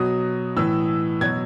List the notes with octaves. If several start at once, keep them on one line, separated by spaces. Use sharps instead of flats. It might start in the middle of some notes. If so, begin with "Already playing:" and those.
Already playing: B2 F#3 D#6
A2 E3 E6
B2 F#3 G#6